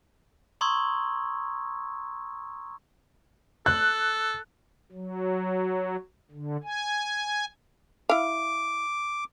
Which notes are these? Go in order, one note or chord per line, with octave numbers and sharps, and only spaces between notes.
A#5 C6 C#6 D#6 E6 G#6
A4 F#6
F#3
D3
G#5
E4 F5 D6